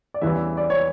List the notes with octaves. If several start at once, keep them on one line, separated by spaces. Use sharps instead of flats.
D5
E2 C#3 E3 G3 D4 E5
D5
C#5